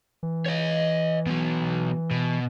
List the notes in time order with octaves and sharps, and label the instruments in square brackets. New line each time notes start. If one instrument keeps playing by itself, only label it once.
[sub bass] E3
[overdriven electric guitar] C#5 D#5
B2 F#3
B2